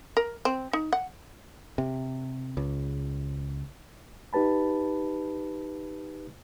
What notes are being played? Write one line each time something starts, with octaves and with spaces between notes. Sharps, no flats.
A#4
C4
D#4
F#5
C3
C#2
D#4 G4 B4 A5 B5